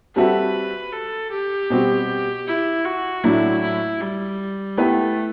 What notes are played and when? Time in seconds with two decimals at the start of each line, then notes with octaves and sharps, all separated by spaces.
0.16 G3 C4 F#4 A4 B4 E5
0.93 A4
1.32 G4
1.70 B2 G3 C4 F#4
2.47 E4
2.85 F#4
3.24 A2 F#3 A3 D4 E4
3.63 E4
4.01 G3
4.78 A3 B3 E4 G4 B4